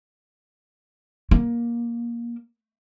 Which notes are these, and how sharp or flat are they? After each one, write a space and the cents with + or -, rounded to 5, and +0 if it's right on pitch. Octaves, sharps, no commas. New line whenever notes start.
A#3 +15